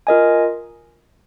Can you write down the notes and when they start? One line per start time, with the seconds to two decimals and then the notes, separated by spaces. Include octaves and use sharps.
0.07 F4 A#4 D#5 G#5